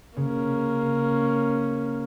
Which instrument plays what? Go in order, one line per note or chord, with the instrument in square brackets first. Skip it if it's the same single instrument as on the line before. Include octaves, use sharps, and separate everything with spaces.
[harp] C#3 [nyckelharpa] A#3 C#4